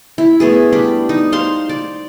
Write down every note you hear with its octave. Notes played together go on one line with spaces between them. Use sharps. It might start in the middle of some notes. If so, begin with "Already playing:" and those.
E4
A3 B3 G#4
G3 D4 B5
D#4
C5 F5 C6
D5